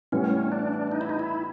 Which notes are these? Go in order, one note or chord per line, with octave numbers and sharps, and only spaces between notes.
A2 E3 G3 B3 C#4
D4
D#4
E4
D#4
E4